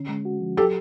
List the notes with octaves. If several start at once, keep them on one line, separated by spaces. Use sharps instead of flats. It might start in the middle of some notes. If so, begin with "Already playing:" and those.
Already playing: D3 C#4
G#3
F#4
F3
F#3 G4 A4